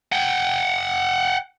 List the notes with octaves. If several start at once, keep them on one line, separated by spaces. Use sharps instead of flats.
F#5 G5